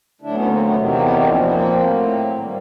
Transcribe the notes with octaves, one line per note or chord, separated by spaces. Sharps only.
D2 D3 F#3 D4 E4
B3 C#4
A#3 C4
A3 B3
E2 C3 D#3 F#3
A#3 C4
B3 C#4
A#3 C4
A#2 F3 C#4
C4
B3
A#3 C4
A2 F#3
G#2 D#3 G3 A#3